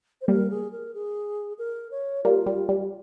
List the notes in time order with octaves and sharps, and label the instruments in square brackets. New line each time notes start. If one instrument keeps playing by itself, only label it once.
[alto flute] C5
[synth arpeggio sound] G3 A#3 [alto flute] A#4
[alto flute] G#4
A#4
G#4
A#4
C#5
[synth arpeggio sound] G3 A#3 [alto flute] F4
[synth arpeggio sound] G3
G3